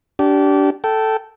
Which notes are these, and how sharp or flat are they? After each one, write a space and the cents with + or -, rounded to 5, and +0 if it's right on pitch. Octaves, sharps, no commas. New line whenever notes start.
D4 -20 G4 -25
A4 +0 G5 -20